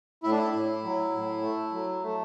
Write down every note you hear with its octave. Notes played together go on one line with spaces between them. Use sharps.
A2 E4
D4
E4
A2
F#3
A2
A3
F#3
A3